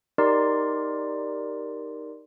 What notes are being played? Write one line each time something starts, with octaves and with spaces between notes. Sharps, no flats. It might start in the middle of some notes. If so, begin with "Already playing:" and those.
D#4 G4 A#4 D5 C6